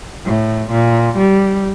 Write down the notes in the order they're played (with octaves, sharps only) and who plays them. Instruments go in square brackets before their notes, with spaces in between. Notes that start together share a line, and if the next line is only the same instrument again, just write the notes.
[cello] A2
A#2
G3